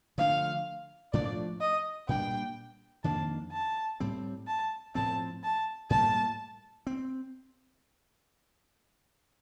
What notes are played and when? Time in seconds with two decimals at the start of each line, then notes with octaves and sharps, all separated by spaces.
0.18 D3 F3 A3 D4 F5
1.13 A2 F3 A3 D4 D5
1.61 D#5
2.09 A#2 G3 D4 G5
3.04 F2 D#3 A#3 D4 A5
3.52 A5
4.00 A2 G3 C4
4.47 A5
4.95 A2 F3 C4 A5
5.44 A5
5.90 A2 G3 A#3 A5
6.87 C4